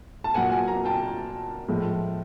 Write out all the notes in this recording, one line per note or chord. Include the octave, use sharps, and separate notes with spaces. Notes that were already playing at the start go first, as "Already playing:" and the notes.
A5
A#2 F#3 A#3 F#5 G#5
F#5 G#5
G#5 A#5
G5 A5
A2 F3 G#3